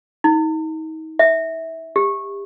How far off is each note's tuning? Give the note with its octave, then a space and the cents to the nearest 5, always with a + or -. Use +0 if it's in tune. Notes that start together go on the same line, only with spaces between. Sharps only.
D#4 +35
E5 -15
G4 +30